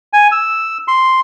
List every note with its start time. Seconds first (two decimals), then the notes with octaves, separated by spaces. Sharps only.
0.13 G#5
0.32 E6
0.88 C6